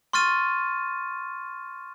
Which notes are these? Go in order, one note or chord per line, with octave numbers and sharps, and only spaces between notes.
C6 C#6 F6 A6 D#7